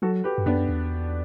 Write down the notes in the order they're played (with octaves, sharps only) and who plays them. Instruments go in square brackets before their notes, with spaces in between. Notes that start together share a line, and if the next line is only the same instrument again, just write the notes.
[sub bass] F#3 [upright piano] F#4 A4
[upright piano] G4 B4
[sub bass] G2
[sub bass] F#2 [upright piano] B3 D4
[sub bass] E2